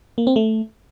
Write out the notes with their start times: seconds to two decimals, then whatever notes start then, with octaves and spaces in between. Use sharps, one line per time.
0.18 A#3
0.27 C4
0.36 A3